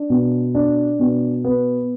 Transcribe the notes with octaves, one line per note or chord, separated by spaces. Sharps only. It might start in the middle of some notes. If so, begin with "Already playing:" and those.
Already playing: D4
B2
D4
B2
B3